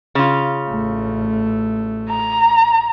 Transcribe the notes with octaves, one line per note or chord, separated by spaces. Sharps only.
C#3 F4
A1 A3
A#5